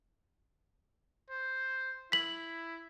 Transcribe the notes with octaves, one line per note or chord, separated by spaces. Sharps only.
C5
E4 B6 F#7